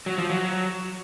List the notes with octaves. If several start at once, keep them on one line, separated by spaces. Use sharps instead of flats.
F#3
F3
F#3